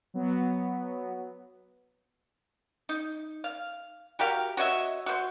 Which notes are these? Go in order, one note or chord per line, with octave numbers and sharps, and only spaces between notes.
F#3 B3
D#4
F5
F#4 G4 A#4 F5
F#4 C#5 D#5 E5
F#4 C5